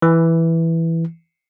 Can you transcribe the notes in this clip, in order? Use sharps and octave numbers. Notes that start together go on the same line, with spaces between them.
E3